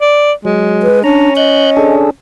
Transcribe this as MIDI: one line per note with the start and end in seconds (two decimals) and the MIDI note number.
0.01 0.32 74
0.45 0.89 54
0.45 1.03 56
0.83 1.02 71
1.04 2.08 61
1.04 1.30 62
1.04 1.34 82
1.37 1.95 75
1.37 1.70 90
1.37 1.70 91
1.77 2.11 62
1.77 2.11 68
1.77 2.11 69